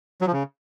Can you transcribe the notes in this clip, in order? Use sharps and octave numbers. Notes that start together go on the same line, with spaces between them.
F#3
F3
C#3